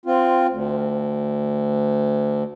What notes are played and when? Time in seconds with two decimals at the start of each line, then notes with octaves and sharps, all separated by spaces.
0.06 C4 F4
0.50 D2